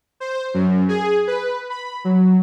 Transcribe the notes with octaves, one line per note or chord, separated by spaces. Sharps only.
C5
F#2
G#4
B4
B5
F#3